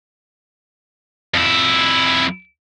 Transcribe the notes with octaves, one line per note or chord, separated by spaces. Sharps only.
F2 E4